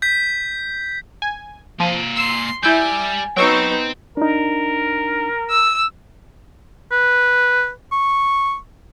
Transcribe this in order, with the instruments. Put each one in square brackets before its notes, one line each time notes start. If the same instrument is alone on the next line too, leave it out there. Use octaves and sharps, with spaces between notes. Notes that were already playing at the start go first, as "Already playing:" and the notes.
[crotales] G6 B6
[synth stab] G#5
[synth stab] F3 [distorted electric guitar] A#3 G#5
[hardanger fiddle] C6 [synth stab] E6
[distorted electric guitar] G3 [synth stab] E4 E6 G6 [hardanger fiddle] G#5
[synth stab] F#3 C#6 E6 [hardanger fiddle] B3 D#4 [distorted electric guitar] C5 G5
[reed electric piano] D4 D#4 [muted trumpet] A#4
[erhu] E6
[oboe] B4
C#6